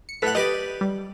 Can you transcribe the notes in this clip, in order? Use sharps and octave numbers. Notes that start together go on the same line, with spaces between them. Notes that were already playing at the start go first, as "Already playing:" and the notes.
C#7
A2 A4 B4 F#5 B6
G4 B4 D5 D#5
G3